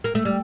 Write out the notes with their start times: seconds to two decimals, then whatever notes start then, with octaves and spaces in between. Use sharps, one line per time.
0.04 A#3
0.15 A3
0.25 G3